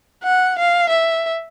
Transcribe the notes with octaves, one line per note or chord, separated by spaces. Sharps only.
F#5
F5
E5